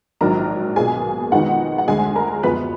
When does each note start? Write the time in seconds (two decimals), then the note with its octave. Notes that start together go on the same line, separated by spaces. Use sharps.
0.21 A#1 G#2 D#3 F#3 D4 A#4 A#5
0.76 B1 B2 A#3 F4 G#4 G#5
1.32 F2 D#3 G#3 B3 D#4 F#4 F#5
1.78 F#5
1.88 D2 D3 G#3 G#4 G#5
2.16 A#4 A#5
2.43 F#1 F#2 F3 B3 B4 B5